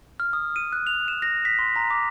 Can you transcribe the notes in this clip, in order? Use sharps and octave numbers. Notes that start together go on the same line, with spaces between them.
F6
D#6
D#7
F#6
F7
E7
A#6
B6
C6
A#5
D6